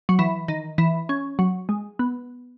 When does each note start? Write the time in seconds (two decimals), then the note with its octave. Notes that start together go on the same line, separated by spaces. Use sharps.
0.09 F#3
0.19 E3
0.48 D#3
0.78 E3
1.09 C#4
1.39 F#3
1.69 G#3
1.99 B3